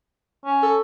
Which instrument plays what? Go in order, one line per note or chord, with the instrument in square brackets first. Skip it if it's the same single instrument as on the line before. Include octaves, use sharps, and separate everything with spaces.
[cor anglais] C#4
[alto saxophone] A4